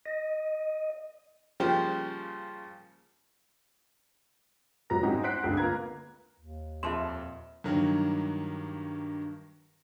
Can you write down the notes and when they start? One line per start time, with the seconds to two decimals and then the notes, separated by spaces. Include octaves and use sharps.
0.06 D#5
1.60 C#3 F3 G3 A#3 G4 C5
4.90 G#1 F#3 G3 B4 A#5 A#6
5.03 G#3 C#4 D#4 E4 F#4 G4
5.23 C5 F#5 F#6 B6 C7 D7
5.44 C#2 G2 D3 G#3
5.57 A#3 F4 B4 A#5 G#6
6.40 D#2
6.83 F2 A#2 E5 A5 C6 E7
7.64 G2 D#3 F#3 A#3